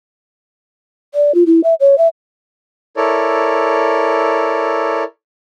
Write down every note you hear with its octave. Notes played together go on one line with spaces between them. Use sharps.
D5
F4
E4
E5
C#5
E5
E4 A4 A#4 C#5 D5